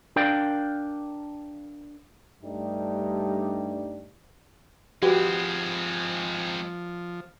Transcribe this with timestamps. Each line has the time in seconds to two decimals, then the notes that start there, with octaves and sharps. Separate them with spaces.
0.16 D4 A#4 D5 F5 G5
2.43 G2 G3 A3 D4 D#4 G4
5.03 F3 G#3 C4 F#4 G4 B4